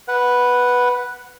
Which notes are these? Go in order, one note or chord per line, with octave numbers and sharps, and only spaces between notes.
B4 F#5